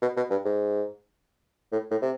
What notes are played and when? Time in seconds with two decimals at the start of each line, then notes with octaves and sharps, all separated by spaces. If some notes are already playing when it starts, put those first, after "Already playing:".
0.02 B2
0.17 B2
0.31 G2
0.45 G#2
1.72 A2
1.91 A2
2.02 C3